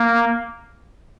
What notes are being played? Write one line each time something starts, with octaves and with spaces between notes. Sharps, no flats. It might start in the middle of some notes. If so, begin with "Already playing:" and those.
Already playing: A#3